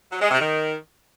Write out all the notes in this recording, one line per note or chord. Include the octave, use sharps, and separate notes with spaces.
F#3
G#3
C3
D#3